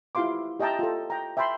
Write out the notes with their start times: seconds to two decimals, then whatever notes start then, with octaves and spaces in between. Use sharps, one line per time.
0.15 E4 F4 G4 F5 C6 D6
0.60 G4 D#5 E5 G5 A5 A#5
0.79 F4 A4
1.10 G5 A#5
1.37 E5 G5 A5 B5 C6